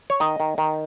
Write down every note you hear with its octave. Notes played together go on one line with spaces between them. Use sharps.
C#5
D#3 D#5
D#3
D#3